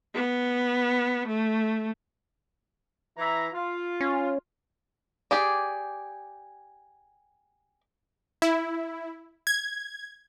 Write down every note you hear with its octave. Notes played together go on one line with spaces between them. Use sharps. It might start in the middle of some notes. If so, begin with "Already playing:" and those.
B3
A3
E3 E4 A#5
F4
C#4
G4 G#4 D5
E4
G#6